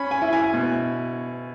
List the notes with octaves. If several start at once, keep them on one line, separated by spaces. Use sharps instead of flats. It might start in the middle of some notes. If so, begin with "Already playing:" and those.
Already playing: C#4 B5
G#5
E4
G#5
B2